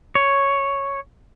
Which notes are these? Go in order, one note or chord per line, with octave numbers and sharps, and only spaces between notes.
C#5